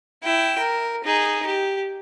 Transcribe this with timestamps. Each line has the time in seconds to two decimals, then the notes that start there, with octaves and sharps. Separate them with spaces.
0.23 E4 G5
0.59 A#4
1.04 D#4 G#4
1.46 G4